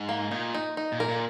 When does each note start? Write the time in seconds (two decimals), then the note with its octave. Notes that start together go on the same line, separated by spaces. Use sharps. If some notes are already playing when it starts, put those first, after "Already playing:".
Already playing: G#2
0.09 A#3
0.31 A#2 D#4
0.54 D#4
0.77 D#4
0.92 A#2
1.00 A#4
1.08 A#2